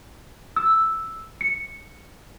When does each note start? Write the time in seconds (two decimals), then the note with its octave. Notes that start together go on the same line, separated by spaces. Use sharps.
0.56 E6
1.41 C#7